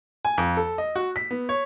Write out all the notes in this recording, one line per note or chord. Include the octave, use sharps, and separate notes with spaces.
G#5
F2
A4
D#5
F#4
B6
B3
C#5